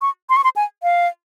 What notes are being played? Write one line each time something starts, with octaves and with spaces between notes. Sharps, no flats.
C#6
C6
C#6
C6
G#5
F5